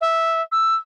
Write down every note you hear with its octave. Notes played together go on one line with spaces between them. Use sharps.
E5
E6